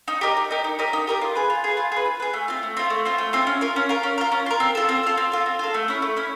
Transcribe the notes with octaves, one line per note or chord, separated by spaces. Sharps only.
D#4
G4 A#4 D#5
D#4
G4 A#4 D#5
D#4
G4 A#4 D#5
D#4
G4 A#4 D#5
F4
G#4 B4
F4
G#4 B4
F4
G#4 B4
F4
G#4 B4
A3
C4 F4
A3
C4 F4
A3
C4 F4
A3
C4 F4
C#4
F4 A#4
C#4
F4 A#4
C#4
F4 A#4
C#4
F4 A#4
C4
F4 A4
C4
F4 A4
C4
F4 A4
C4
F4 A4
A3
C#4 E4
A3
C#4 E4